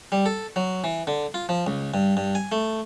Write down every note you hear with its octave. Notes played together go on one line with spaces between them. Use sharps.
G3
A4
F#3
E3
D3
F4
F3
C#2
G2
G2
G#5
A3